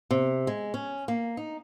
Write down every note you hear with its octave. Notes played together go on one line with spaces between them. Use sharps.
C3
G#3
C#4
A#3
D#4